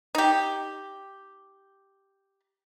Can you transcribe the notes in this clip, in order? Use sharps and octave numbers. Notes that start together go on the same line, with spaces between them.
D#4 G4